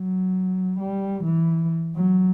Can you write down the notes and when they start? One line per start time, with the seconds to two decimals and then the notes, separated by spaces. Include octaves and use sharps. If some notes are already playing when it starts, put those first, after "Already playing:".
Already playing: F#3
0.79 G3
1.24 E3
1.96 F#3